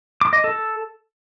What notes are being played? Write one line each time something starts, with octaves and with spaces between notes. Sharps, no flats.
D6
D#5
A4